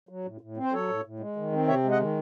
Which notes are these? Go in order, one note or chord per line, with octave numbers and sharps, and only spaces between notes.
F#3
A2
A2
C4
C5
F#3 A4 C#5
A2
A2
G#3
D#3
C4
C3 C#5 E5
G#3
D#5 F#5
D#3